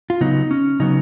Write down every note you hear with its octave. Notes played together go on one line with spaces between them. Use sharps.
F4
C#3 F#3 B3 D#4
C#4
C#3 F#3 B3 D#4